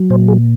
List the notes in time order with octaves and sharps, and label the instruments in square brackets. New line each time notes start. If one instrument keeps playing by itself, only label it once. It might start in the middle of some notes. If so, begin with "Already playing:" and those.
Already playing: [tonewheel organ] F#3
A#2 C5
G#4